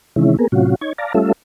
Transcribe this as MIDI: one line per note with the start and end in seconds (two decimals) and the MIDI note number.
0.16 0.37 48
0.16 0.37 51
0.16 0.37 52
0.16 0.37 56
0.16 0.37 61
0.16 0.37 64
0.39 0.47 58
0.39 0.47 59
0.39 0.47 68
0.39 0.47 70
0.52 0.75 45
0.52 0.75 48
0.52 0.75 54
0.52 0.75 61
0.52 0.75 65
0.52 0.75 66
0.81 0.93 63
0.81 0.93 73
0.81 0.93 92
0.98 1.13 74
0.98 1.13 77
0.98 1.13 81
0.98 1.13 82
1.14 1.32 55
1.14 1.32 57
1.14 1.32 61
1.14 1.32 65
1.14 1.32 69
1.14 1.32 76